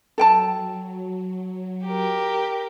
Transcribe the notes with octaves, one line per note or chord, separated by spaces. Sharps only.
F#3 A4 G5 A5
G4 A#4